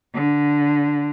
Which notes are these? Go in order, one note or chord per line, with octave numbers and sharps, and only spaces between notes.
D3